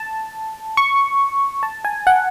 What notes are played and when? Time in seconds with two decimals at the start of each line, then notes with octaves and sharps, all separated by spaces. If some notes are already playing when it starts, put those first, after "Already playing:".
Already playing: A5
0.77 C#6
1.63 A5
1.85 G#5
2.07 F#5